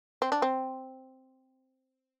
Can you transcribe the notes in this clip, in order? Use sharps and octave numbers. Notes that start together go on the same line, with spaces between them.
C4
D4
C4